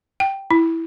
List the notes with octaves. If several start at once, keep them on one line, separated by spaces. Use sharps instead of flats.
G5
E4